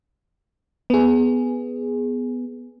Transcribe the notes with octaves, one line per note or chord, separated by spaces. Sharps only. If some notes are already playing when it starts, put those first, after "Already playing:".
B3 G#4